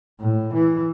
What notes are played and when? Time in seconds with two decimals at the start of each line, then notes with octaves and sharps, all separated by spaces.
0.20 A2
0.54 E3